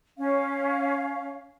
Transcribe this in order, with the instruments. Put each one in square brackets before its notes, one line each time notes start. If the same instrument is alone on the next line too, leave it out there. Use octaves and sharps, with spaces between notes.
[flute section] C#4 F5